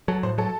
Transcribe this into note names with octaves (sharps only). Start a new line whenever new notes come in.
F#3 A4
A2 C5
F#3 A4